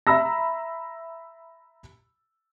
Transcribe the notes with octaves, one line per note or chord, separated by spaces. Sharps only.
E5 A#5 B5 E6 A#6